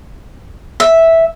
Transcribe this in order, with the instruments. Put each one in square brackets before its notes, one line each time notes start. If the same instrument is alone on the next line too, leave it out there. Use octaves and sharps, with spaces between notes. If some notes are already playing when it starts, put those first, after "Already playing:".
[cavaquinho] E5